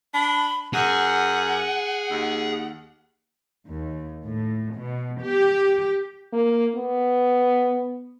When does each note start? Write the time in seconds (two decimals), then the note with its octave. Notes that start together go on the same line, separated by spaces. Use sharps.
0.14 D4 B5
0.74 F#2 G#4 F#5
2.10 D#2
3.67 D#2
4.25 A2
4.75 B2
5.22 G4
6.33 A#3
6.76 B3